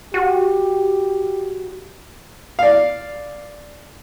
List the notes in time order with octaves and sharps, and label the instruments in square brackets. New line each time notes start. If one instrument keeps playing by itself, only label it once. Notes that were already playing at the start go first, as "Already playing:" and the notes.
[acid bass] F#4 [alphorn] G4
[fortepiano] D5 F5